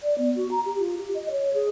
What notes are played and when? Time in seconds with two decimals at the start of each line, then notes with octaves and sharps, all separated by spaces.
0.03 D5
0.18 B3
0.35 F#4
0.51 A#5
0.65 G4
0.80 F4
0.97 G4
1.15 D#5
1.31 C#5
1.54 G#4